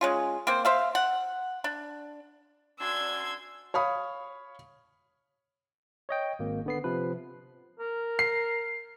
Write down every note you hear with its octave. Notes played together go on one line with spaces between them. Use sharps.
G#3 C#4 F4
A#3 C4 C5
C5 E5 F5
F#5
D4
F#2 D4 C6 E6 G#6
C#5 F5 B5 D#6
C#5 D#5 G5
G#1 A#3
D3 B3 C7
C3 F3 B4
A#4
C7